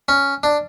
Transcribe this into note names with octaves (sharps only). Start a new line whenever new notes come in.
C#4
D4